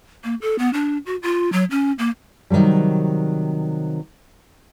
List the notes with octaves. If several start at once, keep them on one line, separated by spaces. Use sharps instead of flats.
A#3
A4
B3
D4
F#4
F4
F#3
C#4
A#3
C3 D#3 E3 F#3 G3